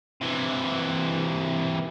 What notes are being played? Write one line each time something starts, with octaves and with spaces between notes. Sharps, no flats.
C3 E3